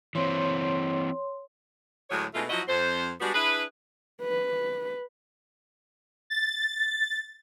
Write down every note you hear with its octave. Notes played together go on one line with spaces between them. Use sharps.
E3 C4 C#5 C6
D2 A2 F#3 G#3 C#5
B2 G#3 A3 D4 D#4 F4
F3 F#3 E4 F#4 D#5
F2 C5
G3 G#3 B3 D4 F#4
D4 E4 G#4 B4
B4
A6